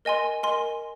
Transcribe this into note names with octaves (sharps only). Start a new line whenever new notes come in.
A#4 D#5 G#5 C6
A#4 D#5 G#5 C6